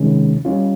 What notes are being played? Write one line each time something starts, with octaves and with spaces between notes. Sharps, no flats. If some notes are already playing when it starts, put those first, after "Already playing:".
Already playing: C3 D#3 G#3 C#4
G3 C#4 F4